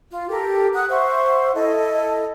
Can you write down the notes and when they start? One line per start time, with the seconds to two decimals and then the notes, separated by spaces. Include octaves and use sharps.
0.11 F4
0.29 G4 A4 A#4
0.74 F#5 D#6 F#6
0.89 C5 E5 F#5 C#6
1.55 E4 A4 D#5